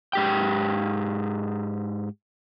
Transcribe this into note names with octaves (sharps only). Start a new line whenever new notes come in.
G#2 G4 G5